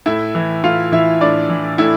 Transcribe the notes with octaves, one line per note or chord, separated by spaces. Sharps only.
A2 E4 E5
E3
A2 F4 F5
E3 E4 E5
A2 D4 D5
E3
A2 E4 E5